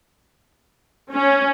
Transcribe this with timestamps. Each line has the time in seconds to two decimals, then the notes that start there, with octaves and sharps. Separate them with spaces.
1.13 C#4